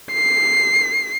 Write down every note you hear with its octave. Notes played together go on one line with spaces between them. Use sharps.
C7